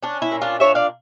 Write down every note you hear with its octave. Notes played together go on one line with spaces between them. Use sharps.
C#4 D4
E4
A#2
D4 F4
D4 C#5 E5
D5 F5